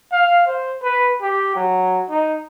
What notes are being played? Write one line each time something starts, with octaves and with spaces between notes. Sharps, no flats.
F5
C5
B4
G4
F#3
D#4